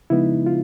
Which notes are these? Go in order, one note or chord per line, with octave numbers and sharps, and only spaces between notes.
C#3 F3 G#3 B3 D#4 E4
F4